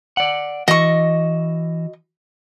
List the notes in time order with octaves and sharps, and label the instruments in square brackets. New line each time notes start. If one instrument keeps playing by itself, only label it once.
[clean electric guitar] D5 F#5
[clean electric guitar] E3 F#4 [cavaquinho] D#5 C#6